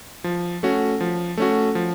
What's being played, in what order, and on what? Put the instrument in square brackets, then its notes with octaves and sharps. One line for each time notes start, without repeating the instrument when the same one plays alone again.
[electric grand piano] F3
A3 C#4 F#4
F3
A3 C#4 F#4
F3